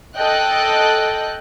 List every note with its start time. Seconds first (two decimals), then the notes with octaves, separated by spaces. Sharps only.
0.16 A4 D#5 G5 F#6